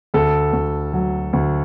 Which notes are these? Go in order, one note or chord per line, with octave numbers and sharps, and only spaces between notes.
D2 A4
D2
F#3
D2